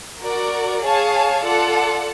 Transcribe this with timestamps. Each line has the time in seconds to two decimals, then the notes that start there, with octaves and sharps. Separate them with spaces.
0.20 F#4 A#4 D5
0.81 G#4 C#5 F5 A5
1.43 F4 A4 D5 F#5 A5